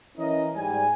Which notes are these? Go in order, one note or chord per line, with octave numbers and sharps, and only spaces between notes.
E3 C#4 E4 A#4 D#5
G#2 G3 G#5